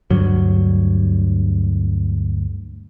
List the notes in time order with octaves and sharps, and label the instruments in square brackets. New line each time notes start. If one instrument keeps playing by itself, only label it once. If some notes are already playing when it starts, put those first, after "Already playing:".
[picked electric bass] D2 G2 F#3